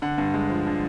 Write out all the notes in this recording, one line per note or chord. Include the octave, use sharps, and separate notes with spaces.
D3 F#5
G2
G#3
F3
D3